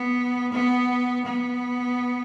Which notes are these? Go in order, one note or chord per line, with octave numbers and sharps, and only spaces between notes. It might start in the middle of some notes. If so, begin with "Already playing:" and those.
Already playing: B3
B3
B3